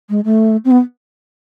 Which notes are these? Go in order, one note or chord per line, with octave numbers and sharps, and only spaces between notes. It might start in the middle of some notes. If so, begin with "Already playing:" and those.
G#3
A3
C4
B3